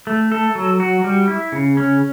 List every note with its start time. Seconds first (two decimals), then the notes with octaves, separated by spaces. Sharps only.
0.07 A3
0.32 A4
0.55 F#3
0.80 F#4
1.04 G3
1.28 E4
1.52 C#3
1.77 C#4